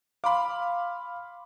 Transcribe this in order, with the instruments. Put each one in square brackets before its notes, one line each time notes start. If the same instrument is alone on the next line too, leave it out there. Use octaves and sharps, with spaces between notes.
[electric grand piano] F5 [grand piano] B5 C6 D6